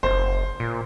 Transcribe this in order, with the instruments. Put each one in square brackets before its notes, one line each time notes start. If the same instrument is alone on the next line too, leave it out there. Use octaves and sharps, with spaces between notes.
[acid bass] F#1 [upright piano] C5
[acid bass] A#2